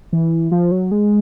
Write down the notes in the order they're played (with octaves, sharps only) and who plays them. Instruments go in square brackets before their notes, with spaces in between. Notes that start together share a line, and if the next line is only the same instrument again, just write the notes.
[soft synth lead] E3
F3
F#3
G#3